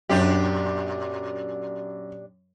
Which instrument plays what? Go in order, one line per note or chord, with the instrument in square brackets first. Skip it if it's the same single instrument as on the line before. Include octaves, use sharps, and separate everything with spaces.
[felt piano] F#2 [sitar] A#2 D4 G4